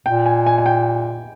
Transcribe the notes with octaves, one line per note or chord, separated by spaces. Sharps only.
A#2 G5
G#5
G#5
G#5
G5